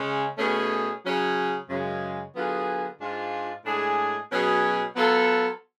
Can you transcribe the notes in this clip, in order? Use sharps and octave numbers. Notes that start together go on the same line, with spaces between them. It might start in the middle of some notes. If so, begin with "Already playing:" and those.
Already playing: C#3 G#3 C#4
B2 A3 C#4 G#4
C#3 F#3 C#4 G#4
F#2 C#3 G#3
D3 F#3 B3 F4 G#4
G#2 G#3 D4 F4
A2 G#3 D4 G#4
B2 F#3 C#4 G#4
F#3 B3 F4 A4